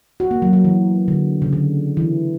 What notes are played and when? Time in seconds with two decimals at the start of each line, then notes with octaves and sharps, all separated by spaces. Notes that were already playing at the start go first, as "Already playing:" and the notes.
0.20 F#4
0.31 A#3
0.42 F#3
0.53 F#3
0.64 E3
1.08 D3
1.42 C#3
1.53 D3
1.97 E3